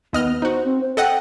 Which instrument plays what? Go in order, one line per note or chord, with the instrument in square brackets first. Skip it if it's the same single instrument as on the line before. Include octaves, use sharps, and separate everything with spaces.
[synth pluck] D#2 D#5 F6 [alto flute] B3
[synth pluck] D#4 F#4 [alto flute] C5
[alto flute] C4
C5
[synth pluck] A4 D#5 F#5 [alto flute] G5